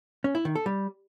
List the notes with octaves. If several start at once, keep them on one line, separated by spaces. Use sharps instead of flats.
C#4
E4
D#3
A4
G3